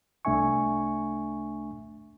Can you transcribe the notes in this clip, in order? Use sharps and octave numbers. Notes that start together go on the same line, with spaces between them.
C2 A3 D4 E5 G#5 C#6